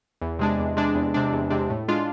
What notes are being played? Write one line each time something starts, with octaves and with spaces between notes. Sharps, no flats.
E2
C3 G#3 D4
E2
C3 G#3 D4
E2
C3 G#3 D4
E2
C3 G#3 D4
A2
G#3 D4 F4